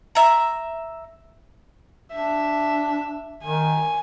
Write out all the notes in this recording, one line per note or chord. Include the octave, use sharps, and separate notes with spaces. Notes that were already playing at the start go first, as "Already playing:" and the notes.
E5 A#5
D4 E5
D#3 G#5